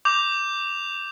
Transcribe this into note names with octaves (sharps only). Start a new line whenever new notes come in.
D6 G6 F7